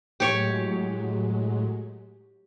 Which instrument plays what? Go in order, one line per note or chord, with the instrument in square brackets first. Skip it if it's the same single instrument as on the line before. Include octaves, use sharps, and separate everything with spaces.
[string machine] A2 F#3 G#3 [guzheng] G4 C#5